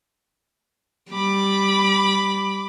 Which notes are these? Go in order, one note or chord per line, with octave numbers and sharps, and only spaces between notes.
G3 B5 D6